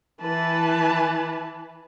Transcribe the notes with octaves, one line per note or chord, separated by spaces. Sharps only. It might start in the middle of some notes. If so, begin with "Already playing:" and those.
E3 B4 A5